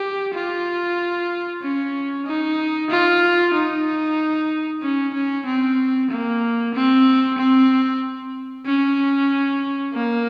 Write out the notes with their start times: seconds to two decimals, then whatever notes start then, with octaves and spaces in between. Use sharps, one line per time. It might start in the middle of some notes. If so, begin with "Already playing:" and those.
Already playing: G4
0.34 F4
1.62 C#4
2.26 D#4
2.90 F4
3.54 D#4
4.83 C#4
5.14 C#4
5.46 C4
6.11 A#3
6.75 C4
7.38 C4
8.66 C#4
9.93 A#3